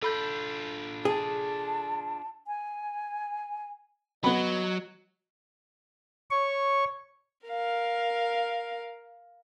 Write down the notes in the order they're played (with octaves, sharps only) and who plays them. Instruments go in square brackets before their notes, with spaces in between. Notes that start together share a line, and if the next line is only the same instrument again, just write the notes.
[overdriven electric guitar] D4 F4 [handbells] A4 B5 G6
[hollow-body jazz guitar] G#4 [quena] A5
[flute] G#5
[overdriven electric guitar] F#3 [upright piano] B3 B5 [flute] D#5
[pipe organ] C#5 C#6
[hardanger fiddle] A#4 F5